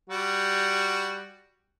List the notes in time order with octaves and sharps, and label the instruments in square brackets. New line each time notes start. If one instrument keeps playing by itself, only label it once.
[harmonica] G3 F#4